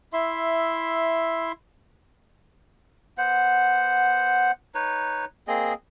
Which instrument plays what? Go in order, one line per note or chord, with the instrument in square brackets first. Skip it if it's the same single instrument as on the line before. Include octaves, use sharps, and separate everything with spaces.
[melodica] E4 E5 C6
B3 C5 F#5
D#4 B4 C#5
A#3 C4 G#4 D#5